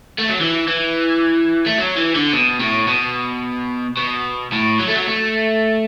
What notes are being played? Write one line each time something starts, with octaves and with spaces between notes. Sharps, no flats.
A3
F#3
E3
E3
A3
F#3
E3
D3
B2
A2
B2
B2
A2
F#3
A3
F#3
A3